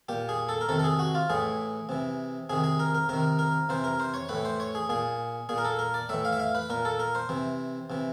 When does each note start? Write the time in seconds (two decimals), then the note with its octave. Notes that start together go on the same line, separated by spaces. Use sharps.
0.09 A#2 G4
0.29 G#4
0.49 A4
0.61 A#4
0.69 C3 D#3 A4
0.79 A4
0.84 G#4
0.99 F#4
1.15 F4
1.30 A2 E3 G#4
1.89 C3 E3
2.49 C3 D#3 G#4
2.64 G#4
2.79 A#4
2.94 A#4
3.09 C3 D#3 A#4
3.39 A#4
3.69 C3 E3 C5
3.84 A#4
4.00 C5
4.14 C#5
4.29 A2 E3 B4
4.45 C5
4.60 C#5
4.75 G#4
4.89 A#2 G#4
5.49 A#2 G#4
5.58 A#4
5.65 A4
5.79 A#4
5.94 D5
6.09 A2 E3 E5
6.25 F5
6.33 E5
6.40 F5
6.55 B4
6.70 A#2 A#4
6.85 A4
6.99 A#4
7.15 C5
7.29 C3 E3
7.90 C3 E3